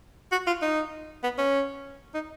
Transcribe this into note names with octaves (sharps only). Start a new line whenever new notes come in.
F#4
F4
D#4
B3
C#4
D#4